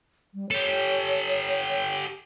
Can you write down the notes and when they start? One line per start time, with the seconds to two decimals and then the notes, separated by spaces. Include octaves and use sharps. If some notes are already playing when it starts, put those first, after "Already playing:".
0.34 G3
0.51 G4 A4 C#5